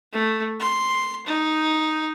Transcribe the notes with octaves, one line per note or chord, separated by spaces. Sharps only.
A3
C6
D#4